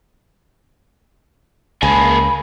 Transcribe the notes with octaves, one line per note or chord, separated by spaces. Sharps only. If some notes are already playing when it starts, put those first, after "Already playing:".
C#2 A#3 G#4 B5